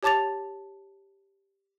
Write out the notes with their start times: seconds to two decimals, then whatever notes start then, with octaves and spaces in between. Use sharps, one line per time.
0.03 G4 C#5 A5 D6 A6 F7